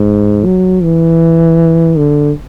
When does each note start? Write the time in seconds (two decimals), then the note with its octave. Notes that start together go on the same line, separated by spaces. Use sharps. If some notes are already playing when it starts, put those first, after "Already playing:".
Already playing: G#2
0.45 F#3
0.83 E3
1.97 D3